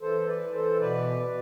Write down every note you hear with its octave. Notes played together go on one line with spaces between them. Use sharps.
E3 A4 C5
B4 D5
E3
A4 C5
B2 B4 D5
B2